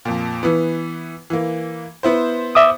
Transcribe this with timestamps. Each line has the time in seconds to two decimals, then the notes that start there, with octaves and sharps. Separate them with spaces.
0.05 F2 A#2
0.43 E3 B3
1.30 E3 A#3
2.03 B3 E4 C5
2.55 E5 D6 D#6